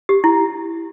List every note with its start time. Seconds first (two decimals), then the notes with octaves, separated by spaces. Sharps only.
0.09 G4
0.24 E4